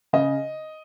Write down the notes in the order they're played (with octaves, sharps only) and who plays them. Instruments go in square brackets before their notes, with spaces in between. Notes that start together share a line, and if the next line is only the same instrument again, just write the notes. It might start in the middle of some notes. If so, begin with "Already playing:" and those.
[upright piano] C#3 D#5